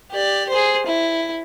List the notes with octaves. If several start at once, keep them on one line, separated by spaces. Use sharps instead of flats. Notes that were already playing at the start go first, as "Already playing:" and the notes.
G4 D5
G#4 C5
E4